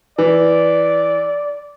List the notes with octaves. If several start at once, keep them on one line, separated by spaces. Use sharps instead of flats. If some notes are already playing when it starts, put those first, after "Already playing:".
E3 D5